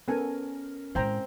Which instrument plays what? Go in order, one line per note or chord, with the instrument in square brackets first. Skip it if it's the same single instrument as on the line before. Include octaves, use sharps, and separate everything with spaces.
[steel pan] B3 A4 G#5 [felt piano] C#4 A#4
[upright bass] A2 G#3 [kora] C4 [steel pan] C5 G5 A#5